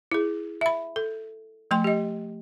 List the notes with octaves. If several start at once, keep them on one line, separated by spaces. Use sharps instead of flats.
E4 G#4
E5 B5
A4
F3 A3 G5 C6
G4 D#5